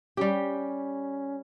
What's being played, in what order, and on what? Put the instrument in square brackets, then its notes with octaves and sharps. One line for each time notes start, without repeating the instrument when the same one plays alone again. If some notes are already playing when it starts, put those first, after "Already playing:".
[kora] G3 G4 [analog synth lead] C#4